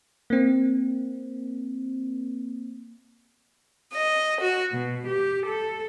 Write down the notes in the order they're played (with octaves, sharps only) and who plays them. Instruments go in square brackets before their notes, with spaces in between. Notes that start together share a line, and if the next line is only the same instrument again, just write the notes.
[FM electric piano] A#3 C4
[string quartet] D#5
F#4
B2
G4
A4